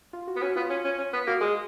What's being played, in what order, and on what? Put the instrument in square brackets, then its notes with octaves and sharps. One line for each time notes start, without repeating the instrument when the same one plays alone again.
[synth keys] F4
F#4
[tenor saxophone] B3
[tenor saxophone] C#4 [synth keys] F#4
[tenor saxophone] B3 [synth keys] F4
[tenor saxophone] C#4
C#4
C#4
B3
[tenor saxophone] A#3 [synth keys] F#4
[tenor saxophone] G#3 [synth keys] G#4